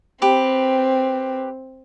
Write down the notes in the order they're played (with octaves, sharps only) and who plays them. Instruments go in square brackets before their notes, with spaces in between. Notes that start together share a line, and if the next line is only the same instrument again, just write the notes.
[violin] C4 [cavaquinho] G4 B4